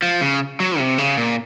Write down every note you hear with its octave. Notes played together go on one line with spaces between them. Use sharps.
F3
C#3
F#3
C3
C#3
A#2